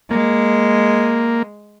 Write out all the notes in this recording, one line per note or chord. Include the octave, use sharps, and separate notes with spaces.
G#3 A#3